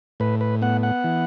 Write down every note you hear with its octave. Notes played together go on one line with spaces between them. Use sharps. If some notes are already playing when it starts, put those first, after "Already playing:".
A2 B4
B4
B3 F#5
F#5
E3